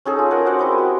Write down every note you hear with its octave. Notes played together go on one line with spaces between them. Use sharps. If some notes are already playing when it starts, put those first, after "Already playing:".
C#4 D#4 G#4 A4
F4
A#4 F#5
F#4 C5 D5 F#5
C4 E4 D#5
G4